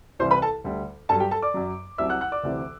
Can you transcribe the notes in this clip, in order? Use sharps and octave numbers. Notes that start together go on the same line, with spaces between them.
C2 C3 E3 G3 C5 C6
B4 B5
A4 A5
D2 D3 G3
G2 F#3 A4 A5
G4 G5
A4 A5
D5 D6
F#2 F#3
C2 C3 F#3 E5 E6
F#5 F#6
F#5 F#6
D5 D6
D2 C3 E3